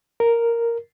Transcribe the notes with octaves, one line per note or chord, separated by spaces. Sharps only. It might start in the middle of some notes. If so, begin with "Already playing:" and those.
A#4